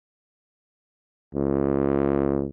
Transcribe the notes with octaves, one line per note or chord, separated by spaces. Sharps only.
C#2